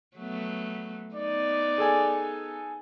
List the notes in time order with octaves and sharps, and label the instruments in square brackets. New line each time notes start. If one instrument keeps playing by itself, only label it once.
[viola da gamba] F#3 A3 B3
[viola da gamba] B3 D#4 [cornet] D5
[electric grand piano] G#4 A4 G#5